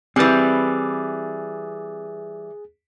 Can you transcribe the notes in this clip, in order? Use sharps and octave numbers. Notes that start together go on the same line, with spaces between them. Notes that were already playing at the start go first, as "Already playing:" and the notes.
E3 G3 C4 G#4 B4 F#6 A6